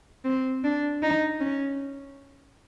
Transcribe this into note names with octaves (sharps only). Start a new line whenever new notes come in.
C4
D4
D#4
C#4